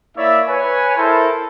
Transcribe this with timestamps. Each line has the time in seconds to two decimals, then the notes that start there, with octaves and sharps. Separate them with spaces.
0.18 A#3 E4 C#5 D5 E5
0.48 B4 C#5 G#5
0.97 E4 A4 A#4 C5